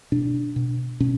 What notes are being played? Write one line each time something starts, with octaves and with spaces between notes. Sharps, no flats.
B2 D4
B2
B2 C#4